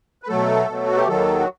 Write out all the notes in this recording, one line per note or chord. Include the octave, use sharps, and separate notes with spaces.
B4
B2 F#3 A3 A4
B2 F#3 A3
F#4
G4
D#2 D#3 F#3 A4
F#4